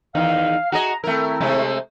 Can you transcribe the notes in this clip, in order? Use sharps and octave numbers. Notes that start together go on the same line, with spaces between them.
E2 D#3 D#4 F5
F#4 G#4 D#5 A#5
D#3 A3 C4 E4 A#4
C3 G#3 A3